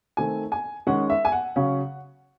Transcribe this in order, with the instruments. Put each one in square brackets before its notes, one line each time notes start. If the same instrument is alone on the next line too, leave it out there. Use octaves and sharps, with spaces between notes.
[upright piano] D#3 A3 C4 G#5
G#5
D#3 G#3 C#4 F#5
E5
G#5
F#5
C#3 F#3 C#4